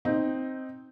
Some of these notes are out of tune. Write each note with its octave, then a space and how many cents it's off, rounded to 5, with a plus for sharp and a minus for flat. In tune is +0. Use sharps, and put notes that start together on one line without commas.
C4 +0 D#4 +0